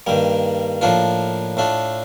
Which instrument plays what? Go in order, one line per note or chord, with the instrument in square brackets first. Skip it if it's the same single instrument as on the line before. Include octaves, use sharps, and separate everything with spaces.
[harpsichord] G2 D#3 G3 A#3
A2 F3 A#3 D4 F4
A2 A3 D4 F4